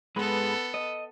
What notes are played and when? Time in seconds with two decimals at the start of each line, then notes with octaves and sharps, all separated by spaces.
0.16 G#2 G#3 B3 A4 B4
0.74 D#5